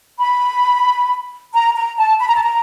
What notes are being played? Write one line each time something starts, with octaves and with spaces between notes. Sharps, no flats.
B5
A#5
A#5
A5
B5
A#5
A5
A#5